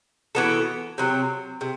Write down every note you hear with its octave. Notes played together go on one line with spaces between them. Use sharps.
E3 B3 F#4 A4
C3 F#3 C4
C3